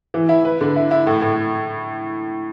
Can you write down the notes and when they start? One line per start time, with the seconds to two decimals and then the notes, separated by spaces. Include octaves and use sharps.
0.14 E3
0.29 E4
0.45 B4
0.61 D3
0.76 E4
0.91 E4
1.07 A2
1.22 A2